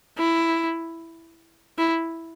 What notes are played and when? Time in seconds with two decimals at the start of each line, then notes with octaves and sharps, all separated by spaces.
0.18 E4
1.78 E4